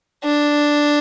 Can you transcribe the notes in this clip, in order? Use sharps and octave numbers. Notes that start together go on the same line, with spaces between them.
D4